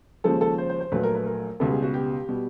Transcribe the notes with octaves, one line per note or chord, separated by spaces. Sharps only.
D#2 C#3 F3 G#3 A4
A4
C5
C5
C5
A#1 A#2 F#3 A3 B4
A#4
B4
A#4
C#2 B2 G3 B3 A4
G#4
F#4
G4
B2 G3